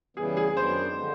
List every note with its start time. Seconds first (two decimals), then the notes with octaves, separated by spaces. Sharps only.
0.17 C#3 E3 G3 B3 G#4
0.37 G#4
0.56 F#2 D#3 F#3 B3 D4 C5
0.96 D3 F3 G#3